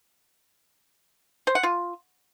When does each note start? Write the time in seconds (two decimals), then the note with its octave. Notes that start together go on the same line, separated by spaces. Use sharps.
1.47 C5
1.55 F#5
1.63 F4